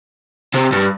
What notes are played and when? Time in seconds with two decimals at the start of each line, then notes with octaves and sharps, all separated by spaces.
0.54 C3
0.73 G2